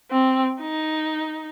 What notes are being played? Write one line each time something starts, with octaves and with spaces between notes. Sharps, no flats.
C4
D#4